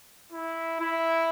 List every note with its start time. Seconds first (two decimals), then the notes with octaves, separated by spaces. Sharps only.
0.32 E4
0.80 E4